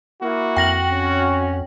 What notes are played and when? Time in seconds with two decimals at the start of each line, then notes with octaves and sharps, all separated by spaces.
0.22 A#3 E4 F#4
0.56 F2 G5 A#6 F#7
0.92 C#4